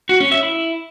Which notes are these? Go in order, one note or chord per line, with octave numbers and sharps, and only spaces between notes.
F#4
C#4
E5
E4